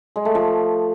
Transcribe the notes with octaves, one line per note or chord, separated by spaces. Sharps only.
G#3
A3
F3